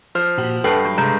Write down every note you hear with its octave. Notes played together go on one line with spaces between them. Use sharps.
F3 C5 F6
A#2 F#4 G4
G2 G3 A4 B4 F#5 G5 A5 C7
F#3 G3 C#6
G2 C3 G#3 A#5 G6